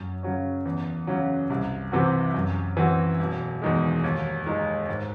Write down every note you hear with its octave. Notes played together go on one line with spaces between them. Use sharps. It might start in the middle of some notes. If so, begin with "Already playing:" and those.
Already playing: F#2
C#3 F#3 C#4
E2
C#3 F#3 C#4
C2
C3 E3 C4 F#4
F#2
E3 C4 F#4
E1
E2 D#3 G#3
D#2
D#3 G#3 D#4
G#2